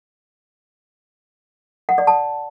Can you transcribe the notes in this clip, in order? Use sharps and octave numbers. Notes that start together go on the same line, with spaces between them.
F#5
D5
A5